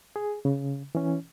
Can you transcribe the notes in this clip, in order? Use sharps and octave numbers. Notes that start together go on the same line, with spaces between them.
G#4
C#3
E3 C#4